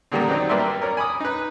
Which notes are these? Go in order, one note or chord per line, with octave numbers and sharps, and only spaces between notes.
A#2 D3 D#3 G3 G#3 A#3
F#3 C4 D4 D#4
G2 A#3 B4 D5 E5 C6
A#4 C#5 D5
G#5 B5 D6 D#6
D#4 B4